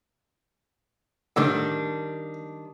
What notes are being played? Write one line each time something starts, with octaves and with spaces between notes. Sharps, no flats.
A2 D3 D#3 G3 D4